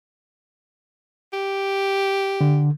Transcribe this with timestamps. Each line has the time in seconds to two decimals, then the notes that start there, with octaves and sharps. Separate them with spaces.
1.33 G4
2.41 D3